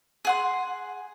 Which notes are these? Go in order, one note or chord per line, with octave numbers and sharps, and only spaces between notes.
G#4 F#5 C6